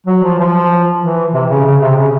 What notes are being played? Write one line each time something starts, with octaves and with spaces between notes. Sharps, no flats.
F#3
F3
F3
E3
C3
C#3
C#3
C3
C#3